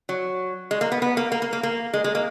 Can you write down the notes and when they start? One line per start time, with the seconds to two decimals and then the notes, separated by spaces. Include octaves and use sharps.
0.09 F#3
0.71 G#3
0.81 A#3
0.92 B3
1.02 B3
1.17 A#3
1.32 A#3
1.42 A#3
1.53 A#3
1.63 A#3
1.93 G#3
2.04 G#3
2.15 A#3